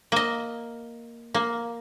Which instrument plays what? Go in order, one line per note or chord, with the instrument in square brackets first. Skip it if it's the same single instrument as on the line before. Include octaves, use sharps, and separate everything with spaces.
[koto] A#3 D#5
A#3